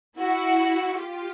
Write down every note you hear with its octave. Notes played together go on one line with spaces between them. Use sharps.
E4 F#4
F4 G4